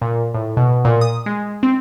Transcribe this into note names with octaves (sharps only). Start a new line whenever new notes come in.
A#2
A2
B2
A#2
D#6
G#3
C4